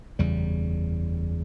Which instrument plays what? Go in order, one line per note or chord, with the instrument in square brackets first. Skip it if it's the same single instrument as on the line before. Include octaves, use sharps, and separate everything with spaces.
[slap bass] F#1 E2 C#3 G3